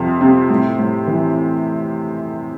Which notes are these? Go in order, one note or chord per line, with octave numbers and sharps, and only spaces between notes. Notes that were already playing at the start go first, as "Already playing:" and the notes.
Already playing: F2 C3
C3
A2
A2
E3